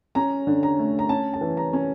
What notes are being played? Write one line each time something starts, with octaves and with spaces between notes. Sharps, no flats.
C#4 A#5
D3
A#5
A3
A#5
C#4 A5
A5
E3
A#5
C#4